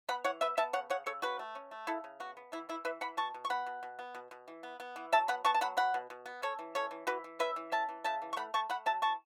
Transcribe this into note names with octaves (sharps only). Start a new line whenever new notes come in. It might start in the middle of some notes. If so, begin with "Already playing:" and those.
B3 F#5 B5
E3 C#5 F#5
B3 B4 E5
B3 E5 A5
C#3 C#5 F#5
C#3 C#5 F#5
C#3 A4 C#5
C#4 F#4 B4
A3
C#4
A3
C#3 E4 A4
C#3
B3 F#4
B3
E3 E4
E3 E4
E3 B4 E5
E3 F#5 B5
B2 A5 C#6
B2
C#6
B3 F#5 B5
B2
B2
B3
B2
B2
E3
B3
B3
E3
F#3 E5 A5
B3 F#5 B5
B3 A5 C#6
A5
F#3 F#5 B5
B2 F#5 B5
B2
B2
B3
C#4 A4 C#5
E3
C#4 A4 C#5
E3
E3 F#4 B4
E3
C#4 B4 E5
E3
C#4 E5 A5
E3
C#3 E5 A5
E3
C#6
A3 F#5 B5
A3 A5 C#6
A3 F#5 B5
F#3 E5 A5
E3 A5 C#6